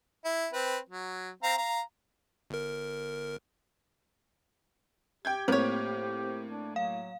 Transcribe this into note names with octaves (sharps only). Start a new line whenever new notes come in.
E4
C4 B4
F#3
C4 F5 A#5
F5 A#5
G1 A#4
G4 G5 G6 G#6
A2 F3 A#3 C4 C5 C#5
D4
F#3 F5